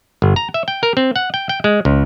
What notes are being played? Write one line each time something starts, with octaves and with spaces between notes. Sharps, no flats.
G1
A#5
E5
G5
A#4
C4
F#5
G5
G5
G#3
C#2